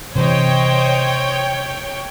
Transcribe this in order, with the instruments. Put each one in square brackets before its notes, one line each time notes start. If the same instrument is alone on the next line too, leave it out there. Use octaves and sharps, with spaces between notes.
[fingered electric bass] C3 E3 G3 [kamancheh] C5 D#5 [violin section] C#5 G5